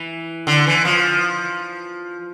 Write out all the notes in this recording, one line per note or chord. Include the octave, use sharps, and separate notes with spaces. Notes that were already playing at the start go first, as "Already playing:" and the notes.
Already playing: E3
D3
E3
F3